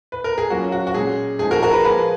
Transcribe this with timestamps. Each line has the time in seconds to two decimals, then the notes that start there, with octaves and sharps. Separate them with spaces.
0.12 B4
0.24 A#4
0.38 G#4
0.50 F#3 A#3 C#4 F4 F#4
0.72 F#4
0.87 F#4
0.94 A#2 G#3 C#4 G#4
1.39 F3 G#3 D#4 G#4
1.51 F#4 A#4
1.62 F#4 A#4
1.73 G#4 B4
1.84 F3 A#3 F4 G#4 B4